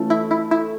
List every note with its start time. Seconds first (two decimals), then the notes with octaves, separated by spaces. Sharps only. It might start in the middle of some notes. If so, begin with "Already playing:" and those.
Already playing: E3 A3 C#4 F4 A4
0.10 E4
0.31 E4
0.51 E4